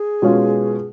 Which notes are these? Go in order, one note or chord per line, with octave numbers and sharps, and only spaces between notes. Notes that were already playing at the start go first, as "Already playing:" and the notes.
Already playing: G#4
B2 G#3 C#4 F4